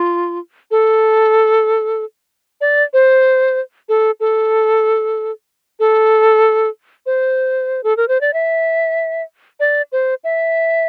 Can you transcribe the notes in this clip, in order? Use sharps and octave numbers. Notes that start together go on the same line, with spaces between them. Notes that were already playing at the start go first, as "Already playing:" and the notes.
Already playing: F4
A4
D5
C5
A4
A4
A4
C5
A4
A#4
C5
D5
E5
D5
C5
E5